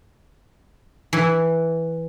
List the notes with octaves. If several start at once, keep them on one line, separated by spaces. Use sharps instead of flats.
E3